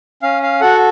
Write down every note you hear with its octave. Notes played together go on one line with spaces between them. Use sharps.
C#4 F5
F5
F#4 A4 F#5